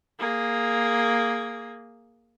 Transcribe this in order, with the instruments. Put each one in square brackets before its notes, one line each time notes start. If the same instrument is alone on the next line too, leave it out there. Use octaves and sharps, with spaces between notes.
[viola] A#3 G#4